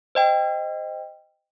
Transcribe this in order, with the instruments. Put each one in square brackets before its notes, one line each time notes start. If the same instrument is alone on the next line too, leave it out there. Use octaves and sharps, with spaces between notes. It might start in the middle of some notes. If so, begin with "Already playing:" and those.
[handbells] C5 D#5 G5